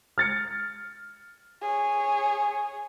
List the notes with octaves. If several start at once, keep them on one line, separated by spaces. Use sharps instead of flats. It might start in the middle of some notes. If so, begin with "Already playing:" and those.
F6 A6 C#7
G#4 C#5